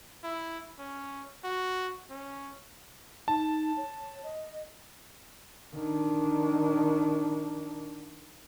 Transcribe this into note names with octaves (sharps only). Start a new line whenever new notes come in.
E4
C#4
F#4
C#4
D#4 A5
C#5
D#5
D#3 D4